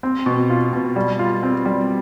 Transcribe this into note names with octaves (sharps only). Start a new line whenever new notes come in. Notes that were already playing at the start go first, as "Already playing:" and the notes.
C4
B2
F4
B2
G3
F4
C4
G3